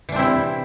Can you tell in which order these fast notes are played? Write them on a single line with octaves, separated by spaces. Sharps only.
E3 D4 C4 E4 C3